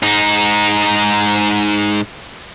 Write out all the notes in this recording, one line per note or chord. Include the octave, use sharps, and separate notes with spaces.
G#2 D#4